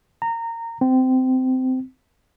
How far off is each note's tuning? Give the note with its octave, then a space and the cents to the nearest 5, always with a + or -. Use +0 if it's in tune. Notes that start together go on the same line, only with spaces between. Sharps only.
A#5 -20
C4 -20